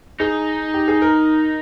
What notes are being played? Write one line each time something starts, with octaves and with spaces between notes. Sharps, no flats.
D#4 G#4
G4
G#4
A#4